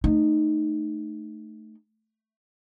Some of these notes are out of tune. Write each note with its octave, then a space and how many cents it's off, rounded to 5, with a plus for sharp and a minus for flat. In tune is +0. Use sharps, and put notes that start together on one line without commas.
A3 +0 D#4 -20